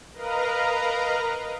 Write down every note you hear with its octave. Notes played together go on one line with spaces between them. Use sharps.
A#4 B4 D#5 F5 A#5